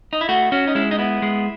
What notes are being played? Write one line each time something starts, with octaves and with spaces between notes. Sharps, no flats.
D#4
E4
A3 F#4
C#4 F#4
D#4
G#3 E4
D#4
B3 E4
G#3